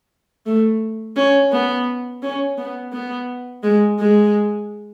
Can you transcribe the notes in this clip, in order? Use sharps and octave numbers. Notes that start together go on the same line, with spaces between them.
A3
C#4
B3
C#4
B3
B3
G#3
G#3